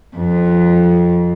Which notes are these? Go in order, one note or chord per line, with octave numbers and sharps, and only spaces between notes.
F2